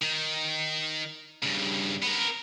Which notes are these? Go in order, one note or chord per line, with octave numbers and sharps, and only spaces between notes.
D#3
G2 C#3
B3 A#4